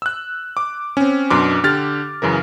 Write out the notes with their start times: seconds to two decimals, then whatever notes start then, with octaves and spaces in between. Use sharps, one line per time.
0.02 E6 F#6
0.57 D6
0.97 C4 C#4
1.30 F#2 B2 D4 C6 D6
1.64 D3 G4 F6 A6
2.22 F#2 C#3 E3 A#4